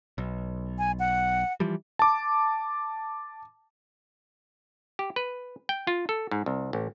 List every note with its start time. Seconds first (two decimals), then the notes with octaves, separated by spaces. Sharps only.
0.18 B1
0.78 G#5
0.99 F#5
1.60 E3 F3 G3
1.99 A5 D6
4.99 G4
5.16 B4
5.69 G5
5.87 F4
6.09 A4
6.31 G#2
6.46 C2
6.73 A1